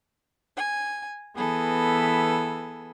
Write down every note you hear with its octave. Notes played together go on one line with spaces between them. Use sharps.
G#5
E3 B3 G#4 A4